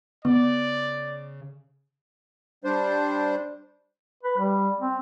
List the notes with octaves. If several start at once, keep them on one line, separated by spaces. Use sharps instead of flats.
C#3 B3 D5
G3 D4 C5
B4
G3
C4